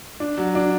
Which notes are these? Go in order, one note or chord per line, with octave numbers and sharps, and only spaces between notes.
D4
F#3
D4